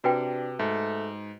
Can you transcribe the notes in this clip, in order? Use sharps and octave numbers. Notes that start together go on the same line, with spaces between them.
C3 D4 F#4 B4 G5
G#2 A3